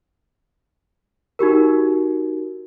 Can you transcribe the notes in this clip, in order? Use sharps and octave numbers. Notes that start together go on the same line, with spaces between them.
D#4 F#4 G4 A#4